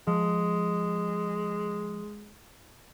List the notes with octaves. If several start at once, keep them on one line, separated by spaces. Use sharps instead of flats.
F3 G#3